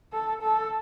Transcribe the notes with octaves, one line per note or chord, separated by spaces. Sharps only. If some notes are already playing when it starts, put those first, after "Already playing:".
A4
A4